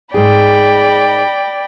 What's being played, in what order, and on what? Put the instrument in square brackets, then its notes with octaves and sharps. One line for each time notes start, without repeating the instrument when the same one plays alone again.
[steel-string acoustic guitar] G#2 G#4 [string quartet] D5 G5 B5